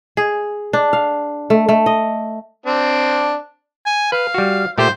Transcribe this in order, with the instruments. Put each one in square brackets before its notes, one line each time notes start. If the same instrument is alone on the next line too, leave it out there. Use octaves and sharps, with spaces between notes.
[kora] G#4
D4
F5
A3
A3
D#5
[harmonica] C4 D4
[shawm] G#5
[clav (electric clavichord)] B4 [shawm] F5
[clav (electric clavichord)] G3 F#4
[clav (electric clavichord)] A#2 A3 G4 [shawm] C5